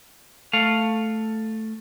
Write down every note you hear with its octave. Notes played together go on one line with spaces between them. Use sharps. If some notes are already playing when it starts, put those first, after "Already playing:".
A3 F5